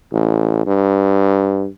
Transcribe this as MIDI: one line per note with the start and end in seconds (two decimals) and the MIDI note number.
0.12 0.63 33
0.66 1.68 43